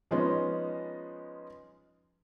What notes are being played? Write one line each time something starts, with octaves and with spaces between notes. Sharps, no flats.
F3 G#3 B3 C#4 D#4 F4